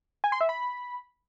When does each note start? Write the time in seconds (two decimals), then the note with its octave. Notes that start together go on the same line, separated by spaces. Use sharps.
0.24 G#5
0.32 C6
0.41 E5
0.49 B5